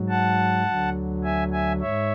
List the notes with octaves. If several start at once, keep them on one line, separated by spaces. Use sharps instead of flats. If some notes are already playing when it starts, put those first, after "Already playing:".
Already playing: G#2 F#3
F#5 A5
D2 D3 F#3
E5 G#5
E5 G#5
G#2 C#5 E5